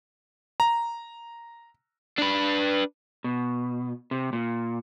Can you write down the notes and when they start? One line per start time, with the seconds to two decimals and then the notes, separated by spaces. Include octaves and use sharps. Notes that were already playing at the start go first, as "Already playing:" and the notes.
0.60 A#5
2.18 D4 B4
3.24 B2
4.11 C3
4.33 A#2